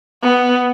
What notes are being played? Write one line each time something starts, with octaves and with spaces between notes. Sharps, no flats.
B3